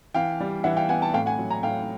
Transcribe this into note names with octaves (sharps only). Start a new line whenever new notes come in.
E3 F5 G5
G3
E3 E5 F#5
F5 G5
B3 F#5 G#5
G5 A5
A2 F5 G5
F#5 G#5
F#3
G#5 A#5
A2 F5 G5